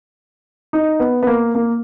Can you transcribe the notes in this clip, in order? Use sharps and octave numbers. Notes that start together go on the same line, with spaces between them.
D#4
B3
B3
A#3
A#3